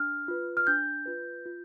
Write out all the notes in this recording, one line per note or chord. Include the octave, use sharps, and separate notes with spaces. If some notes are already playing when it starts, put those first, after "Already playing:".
Already playing: D4 F6
F4 B4
F6
D4 G6
F4 B4
F4